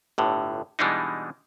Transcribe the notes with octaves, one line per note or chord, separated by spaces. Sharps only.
G1 A2 D3
B2 E3 G3 G#3 D4 D#4